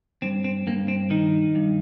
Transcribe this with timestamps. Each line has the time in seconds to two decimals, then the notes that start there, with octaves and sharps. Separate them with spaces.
0.22 G2 C4
0.44 C4
0.67 G2 A#3
0.88 C4
1.10 D#3 D#4
1.55 G2